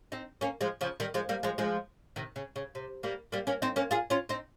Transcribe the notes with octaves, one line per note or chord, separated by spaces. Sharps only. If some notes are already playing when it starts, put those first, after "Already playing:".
C4 D#4
A#3 C#4
F3 G#3
C#3 F3
D#3 G3
F3 G#3
G3 A#3
F3 G#3
F3 G#3
C3 D#3
C#3
C#3
C3
G3 A#3
G3 A#3
A#3 C#4
C4 D#4
A#3 C#4
F4 G#4
C#4 F4
C4 D#4